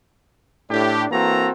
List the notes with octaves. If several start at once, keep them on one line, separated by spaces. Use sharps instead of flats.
A2 D4 G4
E3 A#3 C4 F#4 A4 A#5